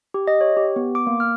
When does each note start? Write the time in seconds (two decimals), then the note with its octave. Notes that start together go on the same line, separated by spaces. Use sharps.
0.14 G4
0.27 D#5
0.41 C#5
0.57 G4
0.76 B3
0.95 D6
1.07 A#3
1.20 F6